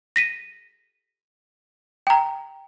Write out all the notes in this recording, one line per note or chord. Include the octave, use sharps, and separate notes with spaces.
A#6 B6 D#7
G5 A#5